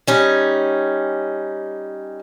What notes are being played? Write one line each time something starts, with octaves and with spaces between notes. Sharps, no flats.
G3 C#4 D#4